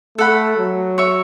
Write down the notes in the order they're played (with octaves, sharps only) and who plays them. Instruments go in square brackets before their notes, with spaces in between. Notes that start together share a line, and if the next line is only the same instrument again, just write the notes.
[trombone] A3 [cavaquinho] A4 F#5 B5
[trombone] F#3
[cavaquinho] C#5 E5 C#6